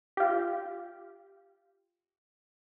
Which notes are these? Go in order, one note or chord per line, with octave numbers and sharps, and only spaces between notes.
F4 G4